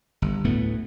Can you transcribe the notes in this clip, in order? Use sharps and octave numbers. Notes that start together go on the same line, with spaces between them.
G1
D2 A2 A3 B3